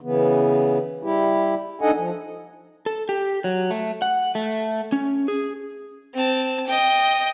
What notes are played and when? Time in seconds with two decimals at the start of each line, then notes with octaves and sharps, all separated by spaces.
0.01 C#3 E3 B3
1.03 G3 E4 G4
1.81 D4 D#4 A4 D#5 F#5 G#5
1.95 F3
2.86 A4
3.09 G4
3.44 F#3
3.71 A3
4.02 F#5
4.35 A3
4.92 C#4
5.28 G#4
6.14 C4 A5
6.67 D#5 G5